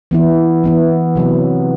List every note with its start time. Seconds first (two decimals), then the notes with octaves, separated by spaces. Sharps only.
0.11 E3 B3 E4
0.64 E3 B3 E4
1.16 C3 F#3 B3